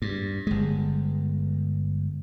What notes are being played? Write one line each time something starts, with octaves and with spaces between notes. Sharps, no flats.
G2
G1 G#3